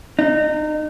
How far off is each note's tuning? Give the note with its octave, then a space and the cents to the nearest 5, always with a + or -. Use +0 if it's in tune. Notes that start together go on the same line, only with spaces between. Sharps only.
D#4 -30